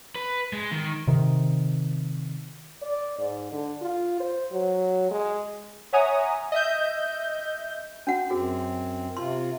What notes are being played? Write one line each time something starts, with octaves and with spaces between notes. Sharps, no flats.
B4
G#3
D#3
C3 D#3
D5
G#2
D3
F4
C5
F#3
G#3
C#5 E5 F#5 G#5 A#5 D#6
D#5 E5 G6
C#4 F#4 F#5
F#2 C4 F#4 G#4
C3 F4 C6